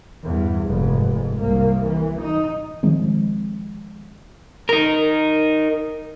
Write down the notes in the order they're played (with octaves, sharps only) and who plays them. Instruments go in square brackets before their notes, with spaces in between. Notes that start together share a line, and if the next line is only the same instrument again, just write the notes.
[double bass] E2 G2
F1 G#2
G#2
C2 A#3
E3
D#4
[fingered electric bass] D#3 F3 G#3 C4
[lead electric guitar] D#4 A#4